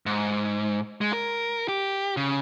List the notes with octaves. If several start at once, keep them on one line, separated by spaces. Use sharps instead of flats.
G#2
G#3
A#4
G4
C#3